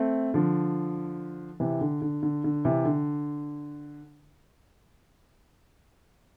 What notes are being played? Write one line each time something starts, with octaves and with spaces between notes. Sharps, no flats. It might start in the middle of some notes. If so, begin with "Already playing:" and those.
Already playing: A3 C4
D3 F3
C3 E3
D3
D3
D3
D3
C3 E3
D3